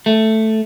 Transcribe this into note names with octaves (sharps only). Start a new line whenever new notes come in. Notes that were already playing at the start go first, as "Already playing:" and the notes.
A3